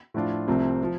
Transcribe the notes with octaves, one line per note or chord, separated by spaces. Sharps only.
A2 F3 D4 F4
C2 C3 F3 A3 C4
F3